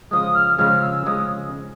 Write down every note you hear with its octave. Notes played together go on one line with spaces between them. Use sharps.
C#3 F3 G#3 D#6
F6
C#3 F3 G#3 F6
E6
E6
C#3 F3 G#3 D#6